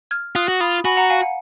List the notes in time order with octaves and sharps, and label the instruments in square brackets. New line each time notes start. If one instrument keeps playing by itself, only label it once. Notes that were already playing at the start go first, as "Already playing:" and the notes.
[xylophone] F6 G#6
[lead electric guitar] F4 [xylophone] D#6 F#6
[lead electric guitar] F#4
[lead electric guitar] F4 [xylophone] B5 D#6
[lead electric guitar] F#4 [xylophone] G#5 B5
[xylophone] F#5 A#5
F5 G#5
F#5